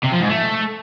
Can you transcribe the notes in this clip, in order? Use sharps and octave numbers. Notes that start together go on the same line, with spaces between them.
C3
F3
G#2
A3